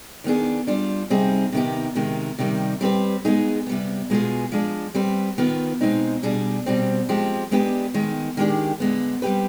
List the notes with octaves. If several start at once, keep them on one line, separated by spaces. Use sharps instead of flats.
D#3 B3 D4 G#4
G3 D4 F4
C3 G3 C4 D#4 G#4
C3 D#3 B3 D#4 G4
C3 D#3 G#3
C3 D#3 G3
G3 C4 G4 B4
G#3 B3 D#4 G#4
C3 G3 B3
B2 G#3 B3 F4 G#4
F3 G#3 D4
G3 C4 G4 B4
D#3 B3 F4 B4
B2 G#3 C4 D#4
B2 G3 D4 G#4
B2 G3 C4
F3 G#3 C4 G4
G#3 B3 D4 G4 B4
D#3 G#3 B3
D#3 G#3 D4 G4
D3 G#3 B3
G3 C4 G4 B4